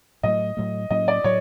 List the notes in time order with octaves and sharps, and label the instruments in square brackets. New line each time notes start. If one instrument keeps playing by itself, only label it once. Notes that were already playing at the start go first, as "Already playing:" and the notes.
[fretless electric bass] A2 F#3 A3 [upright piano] D#5
[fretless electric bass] A2 F#3 A3
[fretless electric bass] A2 F#3 A#3 C#4 [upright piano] D#5
[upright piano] D5
[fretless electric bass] A2 F#3 [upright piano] C#5